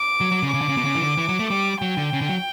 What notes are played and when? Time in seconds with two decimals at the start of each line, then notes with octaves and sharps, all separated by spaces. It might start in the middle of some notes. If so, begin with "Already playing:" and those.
Already playing: D6
0.21 F#3
0.31 F#3
0.43 C#3
0.53 C#3 D6
0.61 D3
0.69 C#3
0.77 B2
0.85 C#3
0.95 E3
1.02 D3
1.18 E3
1.29 F#3
1.39 A3
1.49 G3 D6
1.81 F#3 G5
1.97 D3
2.13 C#3
2.21 D3
2.29 F#3